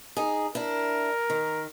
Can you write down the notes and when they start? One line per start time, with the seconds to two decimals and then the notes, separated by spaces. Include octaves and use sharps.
0.17 D#4 G#4
0.55 D4 E4 A#4
1.30 D#3